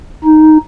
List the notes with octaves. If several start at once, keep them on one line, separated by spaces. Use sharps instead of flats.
D#4